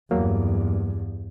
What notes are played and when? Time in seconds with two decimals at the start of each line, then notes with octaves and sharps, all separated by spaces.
0.11 E2 G2 F#3 A#3